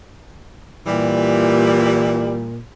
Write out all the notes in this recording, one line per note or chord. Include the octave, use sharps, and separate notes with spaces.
A#2 E3 G3